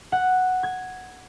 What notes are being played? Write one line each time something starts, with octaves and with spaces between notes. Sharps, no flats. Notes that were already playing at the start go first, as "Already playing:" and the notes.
F#5
G#6